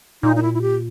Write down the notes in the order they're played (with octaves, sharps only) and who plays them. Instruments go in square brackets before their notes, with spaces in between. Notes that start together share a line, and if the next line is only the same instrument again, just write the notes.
[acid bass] A#2 [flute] D#4
[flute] D#4
E4
E4
G4